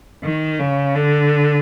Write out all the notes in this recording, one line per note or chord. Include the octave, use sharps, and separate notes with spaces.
D#3
C#3
D3